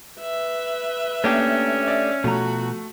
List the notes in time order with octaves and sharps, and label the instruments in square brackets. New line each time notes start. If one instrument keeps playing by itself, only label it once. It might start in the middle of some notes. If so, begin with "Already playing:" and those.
[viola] B4 E5
[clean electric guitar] A3 D4 G4 [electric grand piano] A#3 [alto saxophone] C#4
[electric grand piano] D5 E5
[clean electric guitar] B2 F3 A#5 [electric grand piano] A3 [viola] F#4